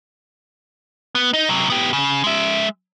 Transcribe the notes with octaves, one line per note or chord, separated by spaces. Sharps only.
B3
D#4
C3 F#3
B3 G4
C#3
G#3 E5